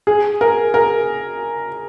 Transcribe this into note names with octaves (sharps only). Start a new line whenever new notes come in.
G#4
A#4
A#4